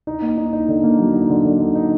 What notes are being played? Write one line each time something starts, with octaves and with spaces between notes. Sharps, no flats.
D#4
A#3
D#4
D#4
D3
A#3
F#3
D#4
D3
D3
D#4
D#4